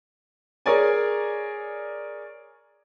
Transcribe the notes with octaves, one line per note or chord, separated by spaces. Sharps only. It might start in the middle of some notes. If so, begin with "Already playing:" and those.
G#4 A#4 C#5 D5 G#5